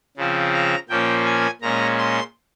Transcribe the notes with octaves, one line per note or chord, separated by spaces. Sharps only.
C#3 F3 C4
A#5
A#2 F3 A#3 C#4 G5
G#5
A#2 G#3 C#4 A#5
C6